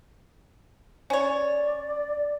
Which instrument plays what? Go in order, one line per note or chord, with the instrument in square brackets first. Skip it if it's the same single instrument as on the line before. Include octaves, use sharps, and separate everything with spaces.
[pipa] C#4 C#5 [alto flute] D5